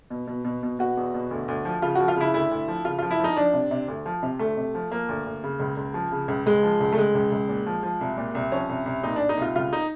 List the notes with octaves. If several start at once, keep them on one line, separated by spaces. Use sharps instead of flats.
B2
B2
B2
B2
B2 F#4
E2
B2
D2
D2
F3
C#3 F4
F3 F#4
F4
C#3 E4
D2 E4
D2
F3
C#3 F4
F3 F4
E4
F3 D#4
F3 D4
C3
C3
D2
F3
C3
D2 A3
C3
F3
F3 A#3
D2
D2
C#3
C#2
C#2
F3
C#3
C#2
C#2 G#3
F3
C#2
A3
C#2 G#3
C#2
C#2
A#2
F3
F3
C2
A#2
C2
F3 C#4
C2
C2
A#2 D#4
A#2 D4
D#4
C2 F4
C#2 F4
D#4